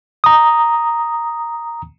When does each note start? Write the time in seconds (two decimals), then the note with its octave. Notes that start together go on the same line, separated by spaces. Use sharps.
0.24 A#5 D#6